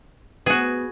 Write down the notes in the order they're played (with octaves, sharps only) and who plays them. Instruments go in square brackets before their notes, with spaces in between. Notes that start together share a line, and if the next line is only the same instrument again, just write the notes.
[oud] B3 [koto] F#4 G#4